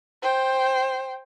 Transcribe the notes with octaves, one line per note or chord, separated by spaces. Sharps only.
C5 G5